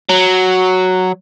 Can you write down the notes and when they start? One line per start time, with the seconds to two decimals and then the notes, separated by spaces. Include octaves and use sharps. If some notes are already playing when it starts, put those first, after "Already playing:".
0.09 F#3